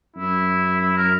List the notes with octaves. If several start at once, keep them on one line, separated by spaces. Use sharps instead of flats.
F#2 E4
E4
A#4